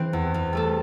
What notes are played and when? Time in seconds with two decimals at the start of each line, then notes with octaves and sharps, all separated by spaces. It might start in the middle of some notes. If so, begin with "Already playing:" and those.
Already playing: E3 C4 C5
0.13 E2
0.34 E2
0.53 G3 A3 A4